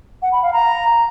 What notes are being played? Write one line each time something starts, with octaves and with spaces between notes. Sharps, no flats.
F#5
B5
F5
A#5